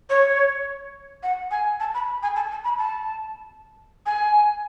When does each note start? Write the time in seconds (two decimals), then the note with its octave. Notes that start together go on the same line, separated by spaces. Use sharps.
0.10 C#5
1.23 F#5
1.51 G#5
1.80 A5
1.94 B5
2.23 G#5
2.36 A5
2.51 A5
2.64 B5
2.78 A5
4.06 G#5